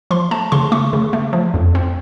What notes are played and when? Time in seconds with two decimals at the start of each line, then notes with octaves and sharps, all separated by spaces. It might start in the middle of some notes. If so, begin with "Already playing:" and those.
0.11 F3 C6
0.31 A3 A5
0.52 C#3 C6
0.72 A3 C#6
0.93 C#3
1.13 A3
1.33 F3
1.54 F2
1.75 C4